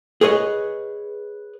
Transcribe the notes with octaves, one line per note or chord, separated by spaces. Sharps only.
G#4 B4 C#5 D#5